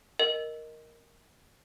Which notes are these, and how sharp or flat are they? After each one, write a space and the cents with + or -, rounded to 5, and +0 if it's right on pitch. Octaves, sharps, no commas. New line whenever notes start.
A#4 +0 D#5 +0